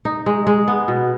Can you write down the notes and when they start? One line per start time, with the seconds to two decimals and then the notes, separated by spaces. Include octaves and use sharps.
0.05 D#4
0.26 G#3
0.47 G#3
0.68 B3
0.88 B2